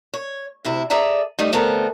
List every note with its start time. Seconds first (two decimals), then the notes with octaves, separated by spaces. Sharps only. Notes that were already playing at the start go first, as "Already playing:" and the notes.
0.14 C#5
0.65 D2 C3 E4
0.90 G#4 A4 D5 E5 A#5
1.39 G3 A3 D#4
1.52 D3 A3 B3 C4 A4 A#4